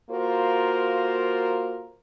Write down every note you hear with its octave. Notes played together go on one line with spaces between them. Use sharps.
A#3 F4 F#4 A4 A#4 C5